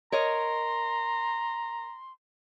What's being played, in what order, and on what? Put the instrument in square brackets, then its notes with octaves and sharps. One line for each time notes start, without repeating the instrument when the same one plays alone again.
[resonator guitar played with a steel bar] A#4 C#5 D#5 [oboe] A#5 [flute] C6